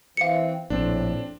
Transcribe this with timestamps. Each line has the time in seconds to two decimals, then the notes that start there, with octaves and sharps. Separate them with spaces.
0.17 E3 C4 F5 C#7
0.70 A#1 A2 C4 D4